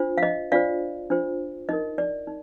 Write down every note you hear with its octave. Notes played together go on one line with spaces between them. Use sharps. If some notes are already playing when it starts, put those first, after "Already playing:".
Already playing: D4 F4 C5
F5
D#5
D4 F4 C5 D5 F5
D4 F4 C5
D#4 A#4 D#5
D5
D#4